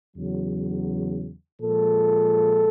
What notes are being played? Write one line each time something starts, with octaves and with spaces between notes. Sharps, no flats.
E2 C#3 F#3
A#2 F3 G#3 A4